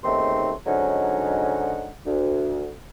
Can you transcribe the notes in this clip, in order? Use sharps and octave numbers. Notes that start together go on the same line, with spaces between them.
D#2 C#3 A3 C4 D#4 C6
G#2 D3 F#3 C#4 D#4 F#5
D2